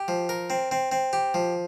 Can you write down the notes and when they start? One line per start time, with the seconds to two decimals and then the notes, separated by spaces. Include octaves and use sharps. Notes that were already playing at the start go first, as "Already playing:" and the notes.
Already playing: G4
0.08 F3
0.29 A#4
0.50 C4
0.71 C4
0.92 C4
1.13 G4
1.34 F3